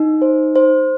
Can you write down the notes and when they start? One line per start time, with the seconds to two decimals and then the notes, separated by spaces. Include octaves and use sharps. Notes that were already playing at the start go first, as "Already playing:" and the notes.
Already playing: D#4
0.22 C5
0.56 C5